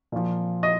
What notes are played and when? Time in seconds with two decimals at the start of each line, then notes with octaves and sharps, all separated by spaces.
0.12 A#2 F3
0.63 D#5